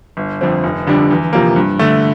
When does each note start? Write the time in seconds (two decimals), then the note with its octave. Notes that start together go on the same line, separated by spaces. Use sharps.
0.17 G1
0.41 F2 D3 F3 C4
0.64 F1
0.87 F2 D3 G3 D4
1.11 E2
1.33 C3 F3 A#3
1.56 G2
1.79 D3 A3